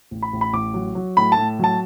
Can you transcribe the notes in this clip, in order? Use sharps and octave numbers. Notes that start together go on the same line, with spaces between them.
A1
B5
A1
B5
A1 D6
F#3
F#3
A2 B5
A5
A2
F#3 A5